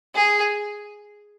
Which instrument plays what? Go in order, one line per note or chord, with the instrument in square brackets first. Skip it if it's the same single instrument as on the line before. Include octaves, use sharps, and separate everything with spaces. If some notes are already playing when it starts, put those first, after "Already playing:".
[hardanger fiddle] G#4